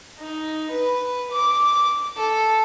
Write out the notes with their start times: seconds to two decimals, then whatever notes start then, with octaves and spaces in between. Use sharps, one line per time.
0.19 D#4
0.71 B4
1.32 D6
2.17 A4